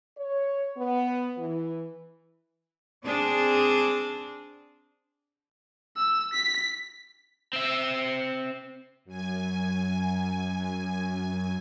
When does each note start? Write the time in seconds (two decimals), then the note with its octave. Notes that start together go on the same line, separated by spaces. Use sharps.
0.17 C#5
0.77 B3
1.37 E3
3.03 C4 D4 G#4
5.97 E6
6.33 B6
7.53 C4 E5
9.05 F#2 G#5